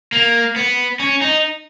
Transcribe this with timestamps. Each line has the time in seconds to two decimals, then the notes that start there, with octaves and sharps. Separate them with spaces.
0.12 A#3
0.56 B3
0.99 C#4
1.21 D#4